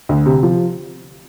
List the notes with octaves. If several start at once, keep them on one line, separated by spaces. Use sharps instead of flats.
D2
C3
F3